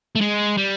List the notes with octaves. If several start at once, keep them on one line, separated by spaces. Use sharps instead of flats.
A3
G#3
G3